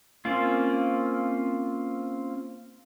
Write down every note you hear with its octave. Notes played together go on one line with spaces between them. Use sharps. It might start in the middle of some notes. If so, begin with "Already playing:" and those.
A#3 C4 C#4 F4